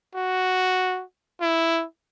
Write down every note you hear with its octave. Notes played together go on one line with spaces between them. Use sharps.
F#4
E4